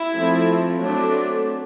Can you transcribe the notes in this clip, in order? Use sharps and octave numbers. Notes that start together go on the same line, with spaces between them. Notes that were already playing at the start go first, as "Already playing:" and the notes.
Already playing: E4
F3 A3 C4
F#3 A3 C4 D4